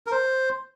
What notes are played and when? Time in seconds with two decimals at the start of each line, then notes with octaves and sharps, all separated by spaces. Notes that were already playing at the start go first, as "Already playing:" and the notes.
0.07 A#4
0.12 C5